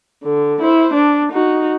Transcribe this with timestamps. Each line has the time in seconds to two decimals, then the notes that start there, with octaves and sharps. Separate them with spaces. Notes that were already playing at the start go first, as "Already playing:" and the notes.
0.24 D3
0.61 E4 C5
0.94 D4
1.32 D#4 F#4